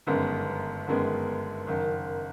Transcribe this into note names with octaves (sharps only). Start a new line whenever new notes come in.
G1 F#2 D#3 G#3 B3
G1 F#2 D#3 G#3 B3
F#1 F#2 D#3